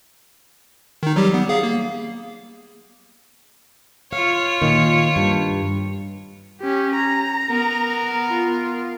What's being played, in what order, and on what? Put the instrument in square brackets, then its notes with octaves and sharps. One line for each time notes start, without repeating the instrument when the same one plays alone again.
[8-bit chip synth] D#3 D#4
F#3 G3 G4
B3
G#4 F5
A#3
[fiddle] F4 C#5 [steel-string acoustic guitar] F5
[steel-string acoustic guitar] A#2 D#3
G2
[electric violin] C#4 G4
A#5
[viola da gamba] B3 A#4
[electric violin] F4